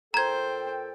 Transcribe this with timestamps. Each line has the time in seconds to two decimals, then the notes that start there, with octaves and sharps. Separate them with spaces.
0.14 A#2 A4 C5 G5 A#5 G#6